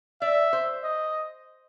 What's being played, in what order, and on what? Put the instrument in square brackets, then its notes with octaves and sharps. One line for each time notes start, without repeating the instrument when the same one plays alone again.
[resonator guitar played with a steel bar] D5 [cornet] E5
[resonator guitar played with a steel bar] C5
[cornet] D#5